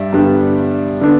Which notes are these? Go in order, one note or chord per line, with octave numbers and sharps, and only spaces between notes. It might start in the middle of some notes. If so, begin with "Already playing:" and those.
Already playing: G2 G3 D5 E5
G2 D3 G3 B3 D4
D3 B3 D4